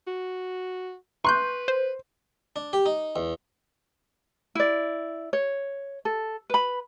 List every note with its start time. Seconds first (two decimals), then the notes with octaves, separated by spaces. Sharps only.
0.07 F#4
1.25 B4 C6 C#6 F#6 G6
1.68 C5
2.56 D4
2.73 G4
2.86 D#4
3.16 E2
4.55 E4 D5
5.33 C#5
6.05 A4
6.50 B4 B5